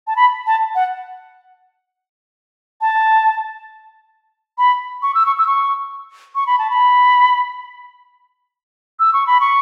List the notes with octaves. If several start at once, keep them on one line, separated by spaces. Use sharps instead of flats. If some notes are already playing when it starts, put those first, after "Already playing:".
A5
B5
A5
F#5
A5
B5
C#6
E6
C#6
E6
C#6
C#6
B5
A5
B5
E6
C#6
B5
C#6